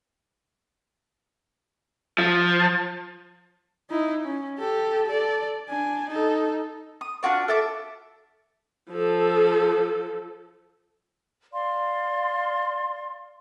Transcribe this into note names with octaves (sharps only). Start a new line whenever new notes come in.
F3
D#4 E4
C#4
G4 A4
A4 D5
D4 G#5
D#4 A4
D#6
D4 F4 F#4 D5
A4 E5 A5 D6
F3 A4
D5 F5 C6